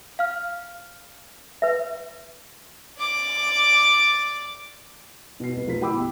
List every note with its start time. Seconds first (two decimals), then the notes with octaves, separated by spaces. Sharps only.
0.19 F5 F6
1.62 B4 E5
2.98 D5 D6
5.40 B2 C7
5.53 C2 B4
5.66 F1 F3 A#4 B4 B6
5.81 E4 G4 G5 B5 D6 E6
5.93 B1